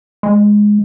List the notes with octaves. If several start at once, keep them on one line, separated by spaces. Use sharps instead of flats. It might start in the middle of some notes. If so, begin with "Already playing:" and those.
G#3